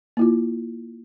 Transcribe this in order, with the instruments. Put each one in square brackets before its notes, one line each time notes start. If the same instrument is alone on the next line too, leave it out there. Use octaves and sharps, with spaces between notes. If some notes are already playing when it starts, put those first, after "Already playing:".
[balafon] A#3 E4 F4